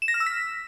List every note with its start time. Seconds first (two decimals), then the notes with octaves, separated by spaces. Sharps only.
0.02 E7
0.08 A#6
0.14 F6
0.20 E6
0.26 B6